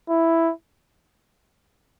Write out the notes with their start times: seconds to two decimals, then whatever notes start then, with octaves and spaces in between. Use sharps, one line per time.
0.09 E4